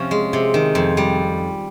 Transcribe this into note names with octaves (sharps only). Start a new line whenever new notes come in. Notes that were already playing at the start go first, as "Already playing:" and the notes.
Already playing: C3 F3 C#4
G#3
C3
D#3
F2
G3